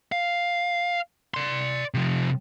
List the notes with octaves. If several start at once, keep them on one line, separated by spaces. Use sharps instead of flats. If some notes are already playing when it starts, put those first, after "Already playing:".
F5
D5 C6
C3 F3